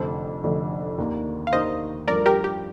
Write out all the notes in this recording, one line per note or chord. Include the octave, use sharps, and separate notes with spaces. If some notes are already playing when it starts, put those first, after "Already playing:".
Already playing: F1 F2 D3 A3 A4 C5
F1 F2 D3 A3
D#2 D#3 A#3 D4
F5
D#2 D#3 A#3 D4 C5 D#5
G2 F3 A3 D4 A#4 D5
G4 A#4
G4